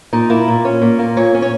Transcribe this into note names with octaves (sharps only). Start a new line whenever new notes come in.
A#2 D#4
A#3 E4
A#2
C#4
A#2
A#3
A#2 C#5
C#4
C#5